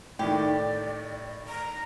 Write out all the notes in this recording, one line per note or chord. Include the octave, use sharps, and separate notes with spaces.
A2 D#3 G4 D5
A#5